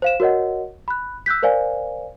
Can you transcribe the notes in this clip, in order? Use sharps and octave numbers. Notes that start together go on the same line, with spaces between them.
C5 F5 E7
F#4 A#4 C#5 D#5 F#5
B5 F#6
E6 F#6 G6 B6
A#4 C5 D5 F5 G#5